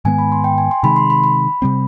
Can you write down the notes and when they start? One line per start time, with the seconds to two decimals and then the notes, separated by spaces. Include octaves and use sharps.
0.05 G#2 D#3 G#3 B3 G#5
0.18 B5
0.32 C6
0.44 G5
0.58 G#5
0.71 C6
0.83 C3 D#3 G#3 B5
0.96 C6
1.10 B5
1.24 B5
1.62 C3 G3 C4